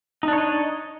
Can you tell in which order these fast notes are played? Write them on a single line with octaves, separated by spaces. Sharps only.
D#4 D4 C#5 D#5